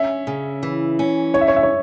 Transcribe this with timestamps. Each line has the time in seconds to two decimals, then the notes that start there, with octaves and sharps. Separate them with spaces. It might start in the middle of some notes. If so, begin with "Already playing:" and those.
Already playing: C#4 E5
0.27 C#3
0.63 E3
0.99 C#4
1.34 E2 C#5
1.41 E5
1.48 C#5
1.56 E5
1.63 C#5